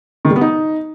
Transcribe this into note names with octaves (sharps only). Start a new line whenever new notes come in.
D#3
G3
B3
D#4